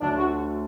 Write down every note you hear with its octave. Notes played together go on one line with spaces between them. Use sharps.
D2 D3 F#3 A3 D4
F#4